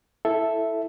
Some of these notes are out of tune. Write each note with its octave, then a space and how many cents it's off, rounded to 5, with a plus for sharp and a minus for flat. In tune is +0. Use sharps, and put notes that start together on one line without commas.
E4 +0 A4 +0 E5 +0